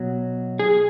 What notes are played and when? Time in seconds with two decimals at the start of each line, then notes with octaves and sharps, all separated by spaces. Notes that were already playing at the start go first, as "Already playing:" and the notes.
Already playing: B2 F#3
0.59 G#4